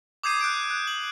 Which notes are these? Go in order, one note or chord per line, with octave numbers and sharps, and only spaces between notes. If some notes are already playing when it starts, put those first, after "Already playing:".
D6 D#6 G6 G#6 C7 D#7
F#6 G6 D7
F#6
F#7